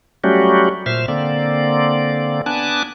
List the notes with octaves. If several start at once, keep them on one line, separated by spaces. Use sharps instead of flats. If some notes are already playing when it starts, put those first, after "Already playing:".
F#3 G3 A3 C#4 F#4 G4
A#2 C5 E5 F6
D3 A#3 C4 D5
B3 D4 G#5 A5 D6 F#6